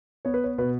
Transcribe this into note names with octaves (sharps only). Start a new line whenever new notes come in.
B3 C#5
B4
C#5
B2 B4